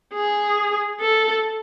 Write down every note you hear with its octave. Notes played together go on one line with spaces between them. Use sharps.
G#4
A4